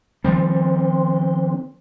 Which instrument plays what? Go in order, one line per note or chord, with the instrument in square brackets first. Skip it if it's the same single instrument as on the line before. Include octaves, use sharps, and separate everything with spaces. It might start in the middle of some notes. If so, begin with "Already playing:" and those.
[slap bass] D#3 F3 G3 [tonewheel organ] C4